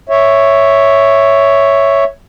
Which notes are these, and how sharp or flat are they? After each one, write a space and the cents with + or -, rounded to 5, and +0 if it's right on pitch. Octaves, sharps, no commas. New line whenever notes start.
C#5 +0 E5 +0